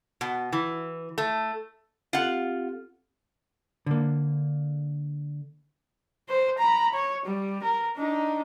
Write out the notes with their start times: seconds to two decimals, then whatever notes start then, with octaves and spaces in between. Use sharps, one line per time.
0.21 B2
0.52 E3
1.18 A3
2.13 C4 F4 G4 A4 F#5
3.86 D3 A#3
6.29 C5
6.58 A#5 B5
6.94 C#5
7.26 G3
7.63 A#4
7.97 D4 D#4